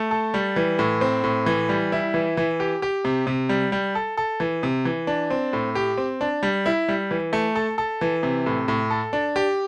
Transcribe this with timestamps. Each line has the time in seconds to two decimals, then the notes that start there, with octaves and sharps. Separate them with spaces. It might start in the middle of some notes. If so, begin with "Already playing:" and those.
Already playing: A3
0.11 A4
0.34 G3
0.56 E3
0.79 A2
1.01 C4
1.24 A2
1.46 E3
1.69 G3
1.92 E4
2.14 E3
2.37 E3
2.60 G4
2.82 G4
3.05 C3
3.27 C3
3.49 G3
3.72 G3
3.95 A4
4.17 A4
4.40 E3
4.63 C3
4.85 E3
5.07 D4
5.30 C4
5.53 A2
5.75 G4
5.97 C4
6.21 D4
6.43 G3
6.66 E4
6.89 G3
7.11 E3
7.33 A3
7.55 A4
7.78 A4
8.01 E3
8.23 C3
8.46 A2
8.68 A2
8.90 A4
9.13 D4
9.36 G4